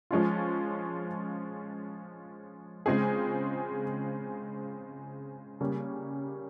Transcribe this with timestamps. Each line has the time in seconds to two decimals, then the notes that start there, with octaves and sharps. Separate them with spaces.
0.11 F3 G#3 C#4 F4
2.86 C#3 G#3 C4 F4 G#4
5.61 C#3 G3 A#3 C#4